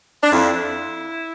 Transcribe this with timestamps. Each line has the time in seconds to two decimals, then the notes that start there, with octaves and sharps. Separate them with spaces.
0.23 D4
0.31 F2 E4